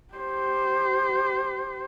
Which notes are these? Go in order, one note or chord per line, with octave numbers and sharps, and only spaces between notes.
G4 C5